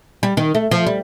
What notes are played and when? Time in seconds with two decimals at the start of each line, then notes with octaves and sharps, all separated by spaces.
0.23 G3
0.37 D#3
0.55 A3
0.71 F3
0.86 G3